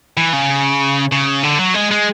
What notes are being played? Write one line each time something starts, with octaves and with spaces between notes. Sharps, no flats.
E3
C#3
C#3
D3
F#3
G#3
G#3